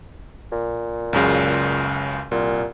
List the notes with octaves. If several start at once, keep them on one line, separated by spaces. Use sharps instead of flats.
A#2
C#2 F#2 C#3
C2 A#2